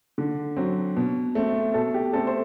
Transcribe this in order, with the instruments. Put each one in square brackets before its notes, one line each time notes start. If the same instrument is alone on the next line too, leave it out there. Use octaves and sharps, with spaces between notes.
[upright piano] D3
F#3 C4
B2
A3 C4
B2 A4
G4
A3 C4 A4
C5